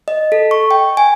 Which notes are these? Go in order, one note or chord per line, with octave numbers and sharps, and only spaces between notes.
D#5
A4
C#6
G5
G#5